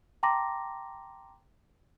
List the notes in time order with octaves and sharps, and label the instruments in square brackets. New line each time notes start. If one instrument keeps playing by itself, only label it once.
[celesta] G5 A5 A#5 C6 D6 A#6